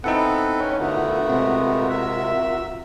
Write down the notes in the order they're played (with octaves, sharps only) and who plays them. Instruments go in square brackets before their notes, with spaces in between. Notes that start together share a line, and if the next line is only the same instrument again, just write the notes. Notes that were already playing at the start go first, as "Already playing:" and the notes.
[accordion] B3 [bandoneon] C4 A4 B4 [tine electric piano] D#4 E4 F#5
[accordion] C#4 [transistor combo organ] C#5 G5
[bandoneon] D3 [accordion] A3 B3 [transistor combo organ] F4 F#4 A#4
[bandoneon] C3 G#3 [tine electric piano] C4
[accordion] E5